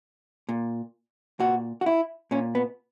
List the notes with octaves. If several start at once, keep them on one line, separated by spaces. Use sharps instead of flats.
A#2
A#2 F#4
F#4
E4
A#2 C#4
B3